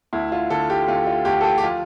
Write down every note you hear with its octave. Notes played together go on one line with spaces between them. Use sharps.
D2 E4
F4
D3 A4
G4
D2 F4
F4
D2 G4
A4
G4
G4
F3 F4